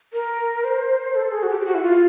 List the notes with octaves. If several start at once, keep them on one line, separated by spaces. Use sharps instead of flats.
A#4
C5
A4
G#4
F#4
G4
G4
F#4
E4
F4